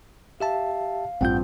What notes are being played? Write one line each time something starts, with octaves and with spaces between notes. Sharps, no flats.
G4 E5 F5 A5
A1 G2 C4 F4 F#5 G5 G6